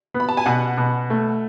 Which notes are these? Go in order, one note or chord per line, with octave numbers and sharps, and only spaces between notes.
B3
B5
A5
G#5
B2 F#5
B2
A3